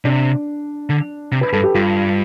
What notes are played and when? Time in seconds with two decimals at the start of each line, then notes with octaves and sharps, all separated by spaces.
0.05 C3 D4
0.90 D3
1.32 C3
1.41 B4
1.52 G2 A4
1.63 G4
1.74 G2 F4